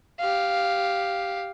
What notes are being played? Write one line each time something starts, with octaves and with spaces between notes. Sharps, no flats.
G4 F5